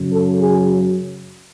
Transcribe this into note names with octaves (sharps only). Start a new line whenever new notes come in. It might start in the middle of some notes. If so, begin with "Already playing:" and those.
Already playing: F#2 C#3 F#3
A4
G#4